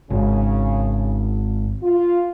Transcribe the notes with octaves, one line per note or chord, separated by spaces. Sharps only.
G#1 C#3
F4